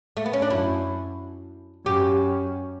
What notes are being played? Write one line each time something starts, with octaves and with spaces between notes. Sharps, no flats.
A3
B3
C#4
D4
F#2 E4
F#2 G4